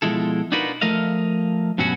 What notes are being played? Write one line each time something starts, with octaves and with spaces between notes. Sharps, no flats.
B2 F3 G#3 E4 A4
D4 D#4 F4 F#4 A#4 B4
F3 A3 A#4 D#5 F5
G2 B2 F#3 C#4 F#4